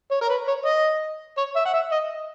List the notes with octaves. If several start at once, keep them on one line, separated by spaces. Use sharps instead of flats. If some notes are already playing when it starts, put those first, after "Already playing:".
C#5
A#4
B4
C#5
D#5
C#5
E5
F#5
E5
D#5